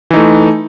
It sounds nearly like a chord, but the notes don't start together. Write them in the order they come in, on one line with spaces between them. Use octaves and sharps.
E3 D#4 A3